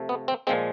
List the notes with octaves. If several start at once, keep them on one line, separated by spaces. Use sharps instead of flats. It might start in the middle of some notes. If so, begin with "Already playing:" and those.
Already playing: C3 F3 A3
B3
C4
A#2 F3 G#3 C4